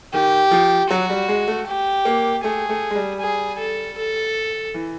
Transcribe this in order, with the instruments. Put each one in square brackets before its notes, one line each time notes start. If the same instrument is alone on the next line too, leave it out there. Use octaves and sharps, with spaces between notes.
[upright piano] D#3 [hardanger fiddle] G4
[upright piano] F3
[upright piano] F#3 [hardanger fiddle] F#4
[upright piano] G3
G#3
A3
[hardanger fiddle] G4
[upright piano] A#3
[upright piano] A3 [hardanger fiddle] G#4
[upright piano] A3
G#3
G3
[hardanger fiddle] G#4
A4
A4
[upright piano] E3